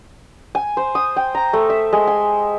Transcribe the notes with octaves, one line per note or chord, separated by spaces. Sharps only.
G#5
C5
D#6
G5
A#5
A3
E5
G#3
G#5